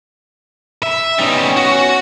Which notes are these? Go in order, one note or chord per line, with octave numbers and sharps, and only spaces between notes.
E5
G3 B3 C#4 D#4
F#4